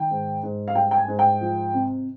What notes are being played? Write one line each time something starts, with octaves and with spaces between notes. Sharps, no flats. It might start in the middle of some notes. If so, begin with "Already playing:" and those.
Already playing: D#3 G5
G#2
G#2
F5
G3 G5
G5
G#5
G#2
G5
F3
C3